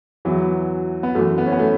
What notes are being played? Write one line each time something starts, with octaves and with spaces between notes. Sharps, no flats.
E2 E3 F#3
B3
F#2 E3 A3
B3
C#4
B3
A3